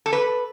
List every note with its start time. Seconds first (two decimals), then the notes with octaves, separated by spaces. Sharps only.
0.06 A4
0.13 B4